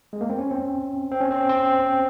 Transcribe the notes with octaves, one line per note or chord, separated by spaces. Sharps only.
G#3
A#3
C4
C#4
C4
C4
C#4
C4
C4